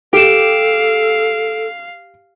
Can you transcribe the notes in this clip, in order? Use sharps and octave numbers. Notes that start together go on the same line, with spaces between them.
G4 A4 F5 D7 E7